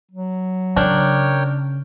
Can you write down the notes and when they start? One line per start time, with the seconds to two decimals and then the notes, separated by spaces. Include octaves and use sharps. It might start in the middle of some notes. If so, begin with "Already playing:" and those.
0.11 F#3
0.76 C#3 D4 A#4 C#5 G5